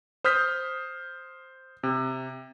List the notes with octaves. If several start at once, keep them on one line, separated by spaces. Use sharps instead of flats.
C5 D#6 F6 G6 B6
C3